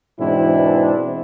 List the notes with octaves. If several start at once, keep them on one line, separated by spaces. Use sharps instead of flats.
G#2 B2 E3 C4 D4 E4